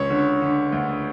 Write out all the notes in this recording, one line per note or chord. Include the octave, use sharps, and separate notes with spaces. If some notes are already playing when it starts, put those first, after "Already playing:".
Already playing: C#2 C#5
D3
D3
D2